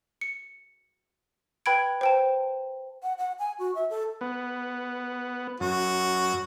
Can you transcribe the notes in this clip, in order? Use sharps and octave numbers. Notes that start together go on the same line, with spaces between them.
C#7
B4 G5 B5 G#6 D7
C5 G5 A5
F#5
F#5
G#5
F#4
E5
A4
B3
F#2 F#4